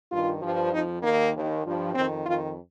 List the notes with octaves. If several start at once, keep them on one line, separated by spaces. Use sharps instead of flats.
G2 D#3 F4
G2 F3
F2 F3 D#4
D#2 D#3 A#3
D#2 D#3
G2 F3
F2 D#3 C4
F2 D#3 F4